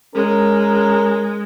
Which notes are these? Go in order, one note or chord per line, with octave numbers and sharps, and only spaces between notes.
G#3 C#4 A#4